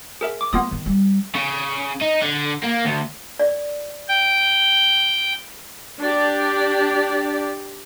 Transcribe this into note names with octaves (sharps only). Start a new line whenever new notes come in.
G#4 A#4 E5
D6
A3 B3 F4 D#6
D#3
G3
C#3
D#4
D3
A#3
D2
D5
G5
D4 G4 D5